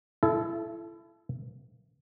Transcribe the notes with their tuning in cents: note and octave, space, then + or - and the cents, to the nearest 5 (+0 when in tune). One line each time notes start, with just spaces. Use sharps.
E4 +30 A4 -20